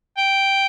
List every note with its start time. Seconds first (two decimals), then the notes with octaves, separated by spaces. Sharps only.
0.18 G5